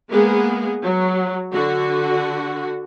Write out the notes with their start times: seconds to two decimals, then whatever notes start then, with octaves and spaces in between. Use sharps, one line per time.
0.10 G#3 A#3 B3 G#4
0.83 F#3
1.53 D3 F#4